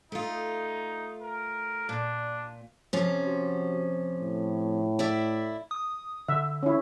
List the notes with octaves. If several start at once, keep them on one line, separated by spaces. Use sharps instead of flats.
A3 D#4 F4
A#4
A#2 D4
C3 F3 C#4
F#4
A2
E4 D5 E5
D#6
D3 E5
C#4 E4